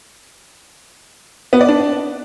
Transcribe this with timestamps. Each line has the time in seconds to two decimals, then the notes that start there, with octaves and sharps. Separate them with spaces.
1.53 B3
1.61 D5
1.68 D4